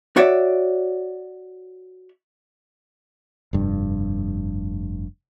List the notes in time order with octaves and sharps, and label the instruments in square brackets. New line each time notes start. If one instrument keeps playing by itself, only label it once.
[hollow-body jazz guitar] F#4 C#5 D5 E5
[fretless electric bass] F1 G2